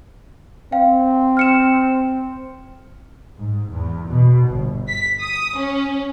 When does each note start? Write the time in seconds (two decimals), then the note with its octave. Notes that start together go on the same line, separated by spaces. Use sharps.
0.72 C4 F5 G5
1.37 F6 C#7 E7
3.37 G#2
3.72 E2
4.08 B2
4.49 G1
4.89 B6
5.21 D#6
5.58 C#4